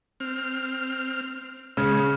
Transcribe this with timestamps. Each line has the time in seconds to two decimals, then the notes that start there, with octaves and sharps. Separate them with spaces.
0.20 C4 F6
1.77 C#3 G#3 C#4